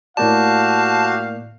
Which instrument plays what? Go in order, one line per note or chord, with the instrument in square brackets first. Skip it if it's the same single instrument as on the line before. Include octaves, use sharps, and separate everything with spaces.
[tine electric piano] A2 A#3 D5 [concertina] F#4 G4 [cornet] F5 [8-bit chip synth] A5